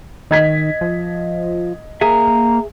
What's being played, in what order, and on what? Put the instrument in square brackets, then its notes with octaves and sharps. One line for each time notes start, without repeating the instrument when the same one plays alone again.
[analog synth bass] D#3 [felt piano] D#5 G#6 B6
[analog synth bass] F3
[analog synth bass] A#3 [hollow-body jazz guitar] G#4 E5 [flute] A#5